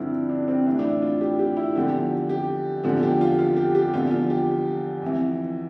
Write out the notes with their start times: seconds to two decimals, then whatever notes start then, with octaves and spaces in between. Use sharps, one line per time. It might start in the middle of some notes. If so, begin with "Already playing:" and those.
Already playing: G2 D3 F3 C4 D4 E4
0.29 D4
0.48 C4
0.66 A2 E3 D4
0.79 D4
0.84 E4
1.02 F4
1.21 G4
1.39 G4
1.57 E4
1.76 E2 D3 F3 G4
2.29 G4
2.84 E2 D3 F3
3.03 G4
3.21 F4
3.39 F4
3.56 G4
3.75 G4
3.92 E2 D3 F3 F4
4.11 F4
4.30 G4
5.02 F2 E3